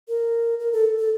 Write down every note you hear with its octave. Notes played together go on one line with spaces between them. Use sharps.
A#4
A#4
A4
A4